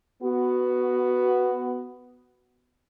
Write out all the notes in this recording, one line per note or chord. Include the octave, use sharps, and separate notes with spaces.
B3 F#4